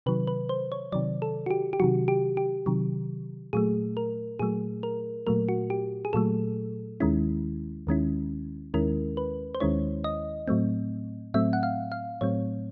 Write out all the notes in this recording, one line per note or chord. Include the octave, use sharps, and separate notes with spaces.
C3 D#3 F#3 B4
B4
C5
C#5
C3 D#3 F#3 D5
A4
F#4
G4
G4
C3 D#3 F#3 F#4
G4
G4
C3 D#3 F#3
A#2 F#3 A3 G#4
A#4
A#2 F#3 A3 G#4
A#4
A#2 F#3 A3 A#4
F#4
G4
G#4
A#2 F#3 A3 A4
D#2 D#3 G#3 C#4 E4
D#2 D#3 G#3 C#4 E4
D#2 D#3 G#3 C#4 E4 A#4
B4
C5
D#2 D#3 G#3 C#4 E4 C#5
D#5
A2 F#3 A3 C4
A2 F#3 A3 C4 E5
F#5
F5
F5
A2 F#3 A3 C4 C#5